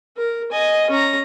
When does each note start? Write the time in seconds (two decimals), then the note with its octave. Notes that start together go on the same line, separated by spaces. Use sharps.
0.17 A#4
0.52 D#5 G#5
0.90 C#4 A#5